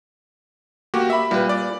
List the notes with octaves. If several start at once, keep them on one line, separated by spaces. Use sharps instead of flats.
A#3 F#4 G4
E5 B5
A#2 G3 B4
D5